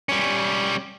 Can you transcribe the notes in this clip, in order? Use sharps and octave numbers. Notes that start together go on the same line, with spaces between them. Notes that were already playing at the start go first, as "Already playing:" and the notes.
G3 C#4